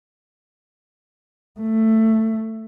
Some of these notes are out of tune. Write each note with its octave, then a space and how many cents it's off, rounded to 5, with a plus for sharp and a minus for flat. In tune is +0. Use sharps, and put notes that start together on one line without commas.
A3 +10